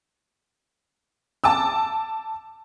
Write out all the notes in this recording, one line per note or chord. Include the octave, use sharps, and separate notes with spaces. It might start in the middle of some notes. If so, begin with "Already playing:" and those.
A5 D6 E6